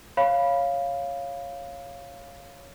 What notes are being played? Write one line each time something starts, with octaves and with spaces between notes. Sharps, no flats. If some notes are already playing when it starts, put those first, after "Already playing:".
C#5 F5 B5